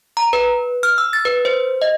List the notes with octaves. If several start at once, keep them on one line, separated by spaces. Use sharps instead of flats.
A#5
B4
F6
E6
A6
B4
C5
D#5